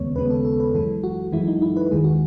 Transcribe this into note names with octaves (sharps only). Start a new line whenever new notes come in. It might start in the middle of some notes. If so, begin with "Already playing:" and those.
Already playing: D#2 C#3 G#3 B3 C#5
D#2 C#3 G#3 B3 B4
A4
A4
B4
F#2 E3 G#3 A4
F#4
F#2 E3 G#3 E4
D#4
E4
B4
D#2 D#3 G#3 G#4
F#4